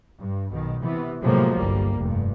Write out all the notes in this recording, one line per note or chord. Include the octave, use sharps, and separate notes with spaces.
G2
B1 B2 D#3
C3 E3 B3
A2 C3 F3 F#3 G#3 A#3
G1 C2 G3 A#3
F1 G2